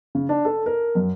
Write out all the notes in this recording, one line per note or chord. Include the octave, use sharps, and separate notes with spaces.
C#3
D4
A4
A#4
F#2